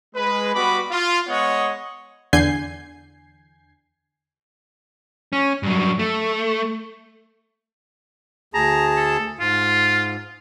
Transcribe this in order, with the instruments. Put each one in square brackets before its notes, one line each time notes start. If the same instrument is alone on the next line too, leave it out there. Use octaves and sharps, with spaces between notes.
[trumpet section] G#3 B4
G3 B3 F#4 B4 B5 D6
F4
G#3 B3 C#5 D#5 F#5
[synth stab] E2 D3 G#5 G6 G#6 C7
[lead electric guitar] C#4
G2 F#3
A3
[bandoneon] D2 G#4 A5 [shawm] A#5
[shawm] A4
[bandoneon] G#2 [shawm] F4